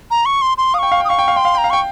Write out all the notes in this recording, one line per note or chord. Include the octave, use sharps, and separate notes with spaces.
A#5
C#6
C6
C6
F5 D#6
G5 C#6
F5
G5
D#6
F5 C#6
G5
F5
G5 C6
F5
G5 A#5
F5
G5 C#6